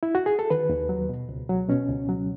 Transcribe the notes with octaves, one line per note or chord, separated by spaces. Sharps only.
E4
F#4
G#4
A4
D#3 B4
D#2
F#3
B2
C#2
F#3
B2 C#4
C#2
F#3